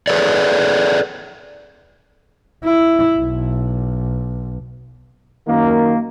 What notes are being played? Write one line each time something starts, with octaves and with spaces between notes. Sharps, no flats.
G#4 A4 B4 C#5 D5
E4
B1
F#2 D#3 A#3